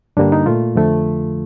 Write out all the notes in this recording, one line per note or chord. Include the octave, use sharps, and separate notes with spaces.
G2 D3 G3 A#3 D4
D#4
A#2 A3 F4
F2 D3 F3 A3